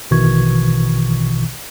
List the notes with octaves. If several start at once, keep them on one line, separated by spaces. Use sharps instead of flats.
A#1 B2 D#3 E3 C#6 G#6